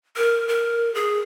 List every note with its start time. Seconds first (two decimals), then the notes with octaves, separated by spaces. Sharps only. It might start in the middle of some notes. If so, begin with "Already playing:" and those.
0.17 A#4
0.48 A#4
0.95 G#4